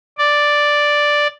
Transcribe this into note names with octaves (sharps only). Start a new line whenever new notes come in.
D5